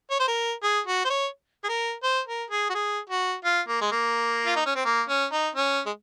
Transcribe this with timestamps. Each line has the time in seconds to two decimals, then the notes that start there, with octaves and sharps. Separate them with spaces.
0.11 C#5
0.19 C5
0.28 A#4
0.63 G#4
0.86 F#4
1.05 C5
1.10 C#5
1.64 G#4
1.69 A#4
2.03 C5
2.27 A#4
2.50 G#4
2.70 F#4
2.74 G#4
3.09 F#4
3.44 F4
3.68 A#3
3.81 G#3
3.91 A#3
4.46 F4
4.56 D#4
4.66 C#4
4.76 C4
4.85 A#3
5.09 C#4
5.32 D#4
5.55 C#4
5.86 G#3